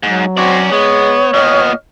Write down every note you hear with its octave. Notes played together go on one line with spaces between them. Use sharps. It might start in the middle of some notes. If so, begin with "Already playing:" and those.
G#2 F#3
C4 C#4 F#4 C5 D5
G#3 B3 C#5
A#2 B3 D#5 F6